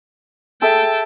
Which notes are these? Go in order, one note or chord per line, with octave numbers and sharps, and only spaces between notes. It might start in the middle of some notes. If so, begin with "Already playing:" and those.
G#4 A4 E5 G5 A5